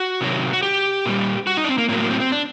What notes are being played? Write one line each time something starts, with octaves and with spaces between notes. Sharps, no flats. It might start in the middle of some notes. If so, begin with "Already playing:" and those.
Already playing: F#4
C3 D#3 F#3
F#4
G4
A#2 G3
F#4
D#4
D4
C4
A#3
A2 F#3 A#3
A#3
C4
C4
D4